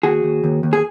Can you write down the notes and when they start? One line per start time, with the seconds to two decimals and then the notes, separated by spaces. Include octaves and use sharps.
0.03 D#2 F#4 G#4
0.23 D#2
0.44 D#2
0.63 D#2
0.73 G#4